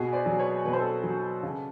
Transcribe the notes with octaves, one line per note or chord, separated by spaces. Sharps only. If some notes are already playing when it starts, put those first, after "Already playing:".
Already playing: B2 F#4 G#4
C5 D5
F#3
B4 C#5
B2 B4
C5
A4 B4
F#3
C#3